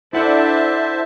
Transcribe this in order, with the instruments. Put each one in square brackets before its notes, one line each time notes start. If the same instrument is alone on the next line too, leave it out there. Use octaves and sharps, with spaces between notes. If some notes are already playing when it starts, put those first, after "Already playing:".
[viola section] D4 A4 [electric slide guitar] E4 F#5 [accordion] C5 E5 A5